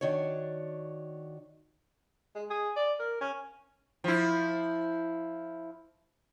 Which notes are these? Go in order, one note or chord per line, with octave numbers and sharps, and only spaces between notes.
D#3 D4 F#4 C#5
G#3
G#4
D5
A#4
C#4
F3 E4